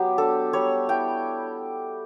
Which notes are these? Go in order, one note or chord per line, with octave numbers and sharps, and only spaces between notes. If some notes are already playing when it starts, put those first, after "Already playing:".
Already playing: F#3 B3 G4
D4 A4
G3 C#5
E4 G5